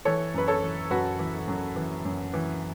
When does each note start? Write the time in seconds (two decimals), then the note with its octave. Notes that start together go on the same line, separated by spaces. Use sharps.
0.05 E3 A4 C#5
0.34 F#2 B4
0.48 A4 C#5
0.62 E3
0.91 F#2 F#4 B4
1.19 E3
1.47 F#2
1.76 E3
2.05 F#2
2.33 E3